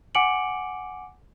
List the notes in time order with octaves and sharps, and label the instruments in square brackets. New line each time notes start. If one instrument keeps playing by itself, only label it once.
[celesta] F#5 G#5 D6 C#7 D7 F#7